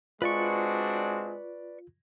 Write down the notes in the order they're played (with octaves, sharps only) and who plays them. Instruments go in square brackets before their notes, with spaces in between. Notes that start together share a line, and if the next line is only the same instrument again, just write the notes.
[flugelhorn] G#3 [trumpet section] C4 D4 F#4 [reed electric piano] F4 [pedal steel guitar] B4 D5 C#6